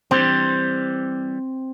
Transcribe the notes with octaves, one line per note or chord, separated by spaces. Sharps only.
E3 G3 C4 G4